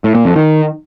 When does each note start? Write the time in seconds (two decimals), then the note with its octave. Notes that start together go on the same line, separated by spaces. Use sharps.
0.04 A2
0.15 A#2
0.25 F2
0.36 D#3